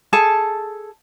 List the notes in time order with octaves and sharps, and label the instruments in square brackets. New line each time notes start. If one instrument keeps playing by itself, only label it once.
[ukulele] G#4 A4 A5